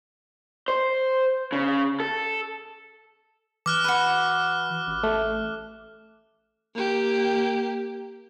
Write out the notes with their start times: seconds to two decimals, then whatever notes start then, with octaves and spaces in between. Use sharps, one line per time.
0.68 C5
1.52 C#3
2.00 A4
3.66 E3 D6 F6 F#6
3.84 F#4 B4
4.87 A1
5.03 A3
6.75 A#3 G4